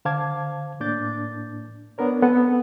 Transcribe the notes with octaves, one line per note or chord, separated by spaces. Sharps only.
D3 C5 F5 A5 D6 G#6
A2 A#3 D4 D6 G6 A6
B3 D4 A#4 C#5
B3 C4 A4 B4